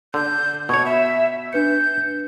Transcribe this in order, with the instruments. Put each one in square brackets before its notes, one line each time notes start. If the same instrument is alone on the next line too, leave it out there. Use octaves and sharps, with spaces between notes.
[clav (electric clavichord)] D3 [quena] G6
[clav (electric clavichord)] B2 C#5 [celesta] C#6 [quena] G#6
[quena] E5 [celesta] B5
[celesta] D4 B4 C#7 [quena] G6